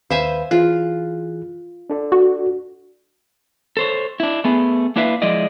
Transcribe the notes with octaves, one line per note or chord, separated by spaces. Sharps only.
D#2 B4 C5 E5 F5 G#5
E3 F4 G#4 F#6
D4 A4 D5
F#4
A4 C5 C#5
D4 E4
A3 B3 G#4
A#3 D4 E4 B4 E5 F5
F3 G#3 E4 D5 D#5